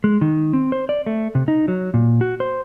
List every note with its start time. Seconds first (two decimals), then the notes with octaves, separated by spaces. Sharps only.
0.04 G#3
0.21 D#3
0.53 C4
0.72 C5
0.89 D5
1.06 A3
1.35 C3
1.48 D#4
1.68 F#3
1.94 A#2
2.21 F#4
2.40 C5